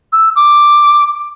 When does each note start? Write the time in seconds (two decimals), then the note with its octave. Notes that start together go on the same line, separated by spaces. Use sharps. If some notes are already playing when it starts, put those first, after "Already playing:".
0.13 E6
0.36 D6